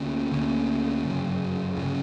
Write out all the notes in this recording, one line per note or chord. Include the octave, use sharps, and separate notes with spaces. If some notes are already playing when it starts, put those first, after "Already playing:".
Already playing: D2 D3 A#3 C#4
D2 D3 A#3 C#4
G1 F#2 C#3
G1 F#2 C#3